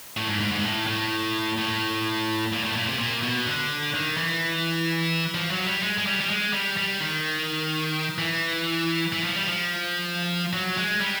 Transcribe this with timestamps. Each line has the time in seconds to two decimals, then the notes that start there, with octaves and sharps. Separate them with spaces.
0.17 A2
0.28 G#2
0.41 G#2
0.52 G#2
0.58 A#2
0.63 A2
0.87 A2
1.58 A2
2.53 A#2
2.64 A2
2.76 A#2
2.87 C3
2.99 A#2
3.22 B2
3.47 D3
3.94 D#3
4.17 E3
5.34 F3
5.51 F#3
5.66 G3
5.83 G#3
5.98 G#3
6.06 G3
6.21 G3
6.29 G#3
6.53 G3
6.77 G3
7.01 D#3
8.18 E3
9.13 E3
9.24 F3
9.35 G3
9.48 F3
10.53 F#3
10.77 G#3
11.01 G3